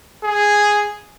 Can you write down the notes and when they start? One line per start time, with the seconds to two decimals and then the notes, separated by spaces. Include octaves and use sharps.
0.24 G#4